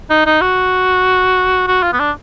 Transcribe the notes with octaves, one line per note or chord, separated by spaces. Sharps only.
D#4
D#4
F#4
F#4
F4
B3
D4